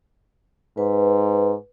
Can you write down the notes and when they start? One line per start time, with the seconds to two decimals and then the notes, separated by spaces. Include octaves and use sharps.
0.78 G#2 B4